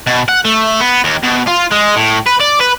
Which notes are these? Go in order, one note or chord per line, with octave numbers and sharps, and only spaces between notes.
B2
F#5
A3
B3
D#2
B2
F4
G#3
A2
B4
D5
B4